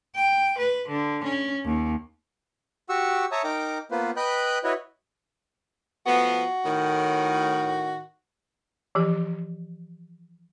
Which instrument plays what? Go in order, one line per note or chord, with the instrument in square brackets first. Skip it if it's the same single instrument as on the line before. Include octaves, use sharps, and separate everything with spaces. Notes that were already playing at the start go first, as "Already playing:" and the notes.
[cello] G5
B4
D3
C#4
D#2
[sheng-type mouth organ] F#4 G4 F#5 C#6 E6
C#5 E5 A5 A#5 C#6 D#6
D#4 A#4 G5 A#5 D6
A#3 B3 F4 B4 C5
B4 D#5 G5 B5 F#6 G6
E4 F#4 B4 C#5 D#5
[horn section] F3 A3 B3 [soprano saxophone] F#4
[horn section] A2 D#3
[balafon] E3 F3 G4